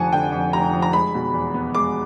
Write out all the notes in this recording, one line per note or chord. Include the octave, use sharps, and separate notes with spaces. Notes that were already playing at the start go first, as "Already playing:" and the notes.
Already playing: F1 F2 D3 F3 F#5 G#5 A5
D3 G5
F2
F1 A#5
F3
A#5
G#3 B5
B2
E2
B3
G#3 D6